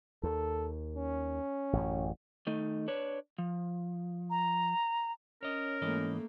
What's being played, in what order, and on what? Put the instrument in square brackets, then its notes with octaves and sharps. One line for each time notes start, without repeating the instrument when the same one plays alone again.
[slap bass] D#2 [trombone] A4
[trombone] C#4
[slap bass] A1 F#2
[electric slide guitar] D#3 A3 D#4
D4 B4 C#5
F3
[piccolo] A#5
[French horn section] C#4 [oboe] A#4 [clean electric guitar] C#5 D#5
[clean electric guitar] G#2 E3 D#5 [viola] A3 A#3